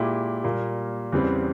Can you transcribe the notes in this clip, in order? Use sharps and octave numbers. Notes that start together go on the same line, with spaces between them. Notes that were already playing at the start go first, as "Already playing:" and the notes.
Already playing: A#2 G#3 E4 G4
A#2 G3 A#3
E2 C#3 E3 G3 C4